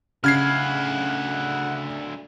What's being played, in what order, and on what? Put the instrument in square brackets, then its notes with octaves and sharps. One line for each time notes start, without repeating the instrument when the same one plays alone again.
[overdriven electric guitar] D2 E4 [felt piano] C#3 [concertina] F#5 [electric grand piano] F6 G#6 C7